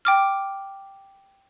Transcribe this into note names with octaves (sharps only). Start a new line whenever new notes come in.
G5 D6 F6